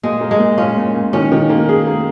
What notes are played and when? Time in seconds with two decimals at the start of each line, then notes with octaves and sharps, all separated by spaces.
0.03 A#2 G#3
0.21 A#3
0.31 G#3
0.39 A#2
0.58 C#4 F4
0.77 A#2
0.94 A#2
1.13 D#3 C#4
1.32 D#3
1.50 A#3
1.69 G#4
1.87 A#3